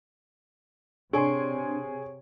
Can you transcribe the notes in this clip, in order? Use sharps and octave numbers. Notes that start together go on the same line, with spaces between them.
C3 D4 G#4 C#5 G#5 C6 C#6 D7